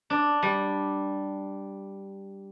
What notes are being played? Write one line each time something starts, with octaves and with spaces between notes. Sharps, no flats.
D4
G3